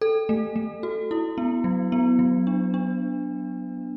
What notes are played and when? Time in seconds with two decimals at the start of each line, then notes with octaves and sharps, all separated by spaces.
0.01 A4
0.29 A3
0.56 A3
0.83 F#4
1.11 E4
1.38 B3
1.64 F#3
1.92 B3
2.19 F#3
2.47 D4
2.74 D4